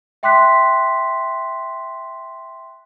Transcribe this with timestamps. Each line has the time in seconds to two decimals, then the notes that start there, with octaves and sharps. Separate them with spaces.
0.23 E5 G5 C6 D6 F#6 B6